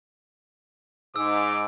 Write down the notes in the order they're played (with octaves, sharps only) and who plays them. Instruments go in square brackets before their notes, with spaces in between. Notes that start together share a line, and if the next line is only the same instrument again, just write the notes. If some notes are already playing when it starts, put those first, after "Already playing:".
[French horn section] G#2 [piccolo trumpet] D6 [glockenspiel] E6